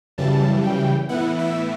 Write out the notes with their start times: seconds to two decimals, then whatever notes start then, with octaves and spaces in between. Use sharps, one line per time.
0.18 F#2 C#3 E3 G3 A5
0.64 G5
1.09 A2 E3 B3 E4 F#5
1.39 E5